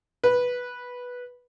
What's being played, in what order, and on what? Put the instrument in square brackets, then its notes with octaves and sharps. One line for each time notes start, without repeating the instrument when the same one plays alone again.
[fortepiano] B4